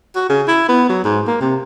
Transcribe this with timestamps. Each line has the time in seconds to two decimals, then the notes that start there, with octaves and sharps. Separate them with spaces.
0.16 F#4
0.29 C#3
0.48 E4
0.69 B3
0.89 F#3
1.04 G#2
1.27 A#3
1.41 C3